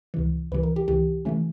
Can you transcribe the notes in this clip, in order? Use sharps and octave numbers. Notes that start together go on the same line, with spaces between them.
C#2 C3 E3
C#2 C3 E3 B4
A#4
G4
C#2 C3 E3 G4
C3 E3 A3 C#4